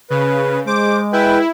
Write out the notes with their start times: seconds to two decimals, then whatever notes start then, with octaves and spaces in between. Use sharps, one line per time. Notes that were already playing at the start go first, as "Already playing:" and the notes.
0.10 C#3 B4
0.67 G#3 C5 D6
1.13 E4 B4 G5